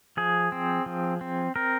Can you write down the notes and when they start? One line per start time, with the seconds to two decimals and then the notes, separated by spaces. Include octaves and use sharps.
0.17 F3 G#4
0.52 C4
0.86 F3
1.21 C4
1.56 C4 A#4